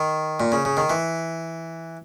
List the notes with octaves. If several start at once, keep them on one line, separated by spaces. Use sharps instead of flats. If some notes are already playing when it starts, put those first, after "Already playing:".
Already playing: D#3
A#2
C#3
C#3
D#3
E3